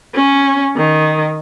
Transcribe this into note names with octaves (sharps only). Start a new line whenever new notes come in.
C#4
D#3